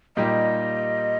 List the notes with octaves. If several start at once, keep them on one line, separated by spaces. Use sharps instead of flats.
A#2 G3 A#3 D#4 G4 D#5